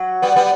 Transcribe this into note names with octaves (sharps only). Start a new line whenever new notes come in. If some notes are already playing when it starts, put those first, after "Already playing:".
Already playing: F#3
G3 B3
G3 B3